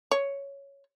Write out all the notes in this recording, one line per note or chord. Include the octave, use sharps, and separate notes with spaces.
C#5